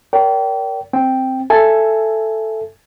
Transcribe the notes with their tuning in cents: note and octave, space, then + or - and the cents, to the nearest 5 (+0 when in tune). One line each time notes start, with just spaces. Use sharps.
A#4 +0 D5 -45 G5 -25
C4 +0 G5 +0
A4 +0 E5 +15 G#5 +0